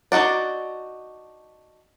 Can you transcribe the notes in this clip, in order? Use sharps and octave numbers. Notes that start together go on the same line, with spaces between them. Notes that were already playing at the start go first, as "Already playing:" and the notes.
D4 D#4 F4 F#4 D5